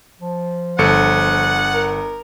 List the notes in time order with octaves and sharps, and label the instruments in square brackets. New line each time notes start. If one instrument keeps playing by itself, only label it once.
[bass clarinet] F3
[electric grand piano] G1 A4 C#7 [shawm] F#5
[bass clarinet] A#4